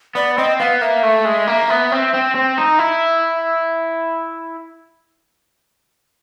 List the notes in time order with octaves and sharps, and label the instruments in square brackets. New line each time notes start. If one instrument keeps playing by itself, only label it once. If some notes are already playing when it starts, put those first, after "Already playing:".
[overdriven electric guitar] B3 [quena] D5
[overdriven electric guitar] C4 [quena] D#5
[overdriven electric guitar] B3 [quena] F5
[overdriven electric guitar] A#3 [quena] E5
[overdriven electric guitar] A3
G#3
A#3
B3
C4
C4
C4
D#4
[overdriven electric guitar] E4 [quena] E5